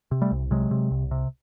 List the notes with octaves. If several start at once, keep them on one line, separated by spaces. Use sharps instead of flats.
C3
G3 A3
C2
C3 F#3 G#3
C3
C2
C3